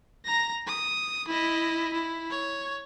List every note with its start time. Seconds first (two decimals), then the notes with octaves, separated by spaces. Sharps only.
0.25 A#5 A#6
0.66 D#6
1.28 E4 D#5
1.93 E4
2.30 C#5